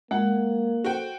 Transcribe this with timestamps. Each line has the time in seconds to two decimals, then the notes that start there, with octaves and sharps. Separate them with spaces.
0.11 G#3 A#3 F#5
0.85 F#4 A4 C5 G5